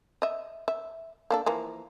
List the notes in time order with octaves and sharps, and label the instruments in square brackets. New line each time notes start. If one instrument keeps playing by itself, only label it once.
[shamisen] D#5 E5
E5
A#3 D4 A4
E3 F3 A#3